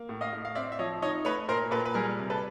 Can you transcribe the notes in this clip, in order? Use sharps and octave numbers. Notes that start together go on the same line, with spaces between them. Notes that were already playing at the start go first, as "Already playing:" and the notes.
Already playing: A#3
A2
D#5 F5
A2
F5
C4 D5 E5
E5
F3 C#5 D#5
D#4 C#5 D#5
A3 B4 C#5
A#2 A#4 C5
A#2 A4 B4
B4
G3 G#4 A#4
C3
A4 B4